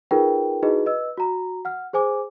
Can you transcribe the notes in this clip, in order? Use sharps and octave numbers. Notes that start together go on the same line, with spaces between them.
D#4 F4 G#4 A#4 B4 G5
D#4 E4 F#4 G#4 B4 D#5
B4 D#5 E6
F#4 A#5
F#5 F6
G#4 C5 G#5 D6